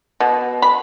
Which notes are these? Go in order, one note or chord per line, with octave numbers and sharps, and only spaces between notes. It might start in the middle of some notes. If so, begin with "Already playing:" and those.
B2
B5